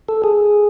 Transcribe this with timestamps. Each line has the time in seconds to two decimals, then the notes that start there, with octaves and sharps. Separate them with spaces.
0.09 A4
0.24 G#4